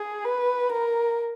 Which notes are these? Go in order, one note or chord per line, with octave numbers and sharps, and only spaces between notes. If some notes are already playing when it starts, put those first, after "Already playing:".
Already playing: G#4
B4
A#4